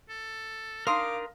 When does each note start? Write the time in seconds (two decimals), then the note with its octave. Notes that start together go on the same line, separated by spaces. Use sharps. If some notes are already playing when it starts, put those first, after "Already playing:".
0.09 A4
0.87 D4 D#4 A#4 F5 C6 D6 D#6